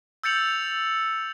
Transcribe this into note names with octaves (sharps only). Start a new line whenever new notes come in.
E6 G6 A6 C#7 F7 F#7